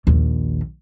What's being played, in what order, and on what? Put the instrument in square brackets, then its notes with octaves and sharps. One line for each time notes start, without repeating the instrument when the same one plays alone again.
[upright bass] A#1 D#2